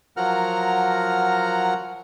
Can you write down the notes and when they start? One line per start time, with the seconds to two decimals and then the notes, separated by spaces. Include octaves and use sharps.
0.17 F3 F#3 A#4 F#5 A#5 F6